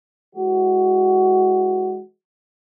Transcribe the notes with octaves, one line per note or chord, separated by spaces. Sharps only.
E3 G#3 F#4